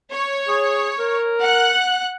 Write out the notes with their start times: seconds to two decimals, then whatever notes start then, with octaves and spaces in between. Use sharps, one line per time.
0.12 C#5
0.48 G#4
0.99 A#4
1.41 F#5 F#6